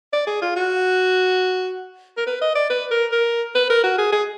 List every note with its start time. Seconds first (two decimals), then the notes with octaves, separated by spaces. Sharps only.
0.13 D5
0.27 G#4
0.42 F4
0.56 F#4
2.17 A#4
2.27 B4
2.41 D#5
2.55 D5
2.70 B4
2.91 A#4
3.12 A#4
3.55 B4
3.70 A#4
3.84 F#4
3.98 G#4
4.12 G#4